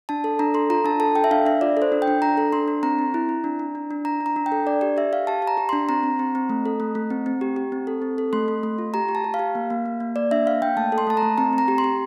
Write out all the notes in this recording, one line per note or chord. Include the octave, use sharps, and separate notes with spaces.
D4 A5
A4
D4 A#5
A4 C6
F4 A#5
D4 A5
A4 A5
A4 G5
E5
D4 F5
D4 E5
F4 D5
A4
C5
D4
G5
D4
D4 A#5
A4
D4 C6
D4
C4 A#5
C4
E4
E4
D4
D4
D4
D4
D4 A#5
D4
A#5
D4
G5
A4
D4 D5
G4 D5
G4 E5
G4 F5
G4 A5
G4
A#5
G4
D4 C6
C4 A#5
C4
C4
C4
A3
A4
A3
A3
C4
C4
G4
G4
C4
A4
C4
A4
A3 C6
A3
A3
F4
G4 A#5
G4
A5
G4
F5
G4
A#3
A#3
A#3
A#3
A#3 D5
D4 E5
A#3 F5
A#3 G5
A3 A5
A4
C6
A3 A5
A#5
A3
C4 A#5
C4
A#5
G4
C6
G4